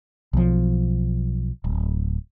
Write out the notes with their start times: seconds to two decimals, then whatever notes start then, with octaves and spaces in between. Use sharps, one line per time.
0.33 B1 F3
1.64 D1